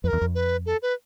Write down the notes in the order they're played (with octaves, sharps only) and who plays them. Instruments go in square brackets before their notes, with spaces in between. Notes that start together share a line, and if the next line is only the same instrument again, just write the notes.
[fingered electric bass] F2 [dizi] B4
[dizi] A#4
[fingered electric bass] E2
F2
[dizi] B4
A4
B4